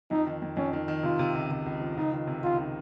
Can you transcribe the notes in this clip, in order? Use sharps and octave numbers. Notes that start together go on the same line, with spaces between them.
F2 D#4
D#3
F2
F2 C#4
D#3
D#3
C3 F4
C3
C#2
C3
C#2
F3
C#2 D#4
D#3
C3
C#2 F4
D#3